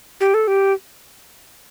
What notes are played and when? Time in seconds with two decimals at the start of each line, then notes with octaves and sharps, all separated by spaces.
0.21 G4
0.34 A4
0.47 G4